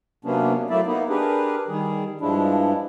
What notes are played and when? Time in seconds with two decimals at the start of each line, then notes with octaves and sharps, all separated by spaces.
0.25 C3 F#3 A#3 B3 C#4 D4
0.70 F#3 A3 A#3 E4 D5 E5
0.86 A#3 B3 D#4 E4
1.09 D4 G4 G#4 A#4 B4
1.68 D#3 G3 G#4
2.21 G2 F3 G#3 D4 E4